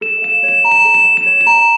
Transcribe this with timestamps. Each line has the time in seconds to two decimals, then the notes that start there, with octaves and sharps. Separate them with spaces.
0.01 A4 E7
0.22 F5 E7
0.43 C#5
0.48 E7
0.64 A#5
0.71 E7
0.84 A4
0.94 E7
1.05 F5
1.17 E7
1.26 C#5
1.41 E7
1.46 A#5